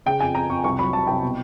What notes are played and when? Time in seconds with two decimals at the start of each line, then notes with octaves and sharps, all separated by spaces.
0.06 C#3 G5
0.20 F2 G#5
0.35 F2 A#5
0.49 F2 C#6
0.64 C2 C#6
0.79 F#3 B5
0.93 F#3 A5
1.07 C2 G5
1.22 B2